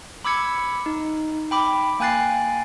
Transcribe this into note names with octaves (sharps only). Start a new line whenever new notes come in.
B5 D6 E6 G#6 C#7
D#4
G5 B5 D6
A#3 G5 G#5 F#6 A6 C7